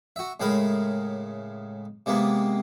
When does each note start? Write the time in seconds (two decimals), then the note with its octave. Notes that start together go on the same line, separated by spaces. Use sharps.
0.16 F#4 E5
0.40 A2 C#3 G#3 A#4 B5
2.06 C3 G#3 A#3 B3